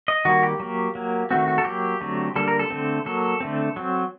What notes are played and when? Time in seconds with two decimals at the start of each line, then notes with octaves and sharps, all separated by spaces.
0.08 D#5
0.25 D#3 G3 A#3 F#4
0.43 G4
0.60 F#3 A#3
0.95 F#3 A#3
1.31 D#3 A3 C4 F#4
1.48 F#4
1.58 A4
1.65 F#3 A#3 G4
2.01 D3 F#3 A3 C4
2.36 D3 G3 A#3 A4
2.48 A#4
2.59 A4
2.70 D3 A3 C4
3.06 F#3 A#3 A4
3.40 D3 A3 C4
3.76 F#3 C4